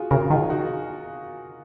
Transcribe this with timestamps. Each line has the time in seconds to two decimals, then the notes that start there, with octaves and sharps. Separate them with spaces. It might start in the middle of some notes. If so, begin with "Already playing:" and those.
Already playing: F4 F#4 G#4
0.11 C#3 F#4 A#4
0.30 D#3 F4 G#4
0.50 D#4 F#4